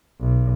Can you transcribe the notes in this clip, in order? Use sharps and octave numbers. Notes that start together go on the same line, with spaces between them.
B1